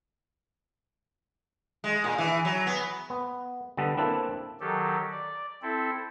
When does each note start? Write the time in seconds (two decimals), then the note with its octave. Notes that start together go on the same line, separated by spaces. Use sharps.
1.84 G#3
2.04 A#2
2.18 E3
2.45 F#3
2.67 B3
3.10 B3
3.77 D3 G3 B3 A4 B4
3.97 A#3 C4 D4 E4 A4 B4
4.60 D#3 F#3 G4 A4
5.11 D5
5.62 C4 E4 A4